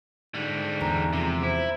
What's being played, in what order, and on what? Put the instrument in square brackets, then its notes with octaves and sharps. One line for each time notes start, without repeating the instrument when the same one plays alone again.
[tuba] G#2 [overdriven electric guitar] D3 G3
[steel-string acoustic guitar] E2 [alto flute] A#5
[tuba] F2 [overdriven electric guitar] C3
[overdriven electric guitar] E4 [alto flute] C5